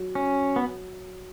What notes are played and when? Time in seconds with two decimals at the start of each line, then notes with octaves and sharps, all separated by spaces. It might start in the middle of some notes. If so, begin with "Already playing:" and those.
Already playing: F#3
0.15 C#4
0.56 B3